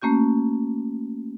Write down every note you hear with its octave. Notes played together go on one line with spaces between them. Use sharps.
A3 A#3 C#4 F#4 G6